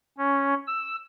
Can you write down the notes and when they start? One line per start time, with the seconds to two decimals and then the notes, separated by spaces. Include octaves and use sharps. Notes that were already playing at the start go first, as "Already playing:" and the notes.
0.18 C#4
0.67 E6